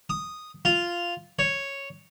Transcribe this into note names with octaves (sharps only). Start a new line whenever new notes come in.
D#6
F4
C#5